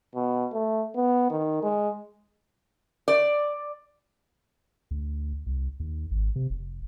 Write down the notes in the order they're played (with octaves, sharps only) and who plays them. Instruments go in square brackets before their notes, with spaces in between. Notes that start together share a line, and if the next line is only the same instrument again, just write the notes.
[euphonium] B2
A3
B3
D#3
G#3
[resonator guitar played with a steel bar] D5
[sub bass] D2
C2
D#2
G#1
C3
F1